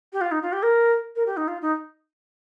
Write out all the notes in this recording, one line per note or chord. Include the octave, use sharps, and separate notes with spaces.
G4
F4
D#4
F4
G4
A#4
A#4
G4
D#4
F4
D#4